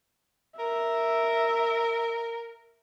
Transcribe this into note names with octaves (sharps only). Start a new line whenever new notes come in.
A#4 E5